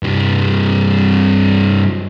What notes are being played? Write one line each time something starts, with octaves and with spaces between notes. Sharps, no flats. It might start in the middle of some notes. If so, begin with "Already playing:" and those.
G2 C3